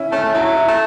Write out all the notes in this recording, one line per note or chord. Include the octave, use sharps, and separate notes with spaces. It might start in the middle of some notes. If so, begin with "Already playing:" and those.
Already playing: C#4 E4
A3 C#4
A3
F#3 E4
E4
A3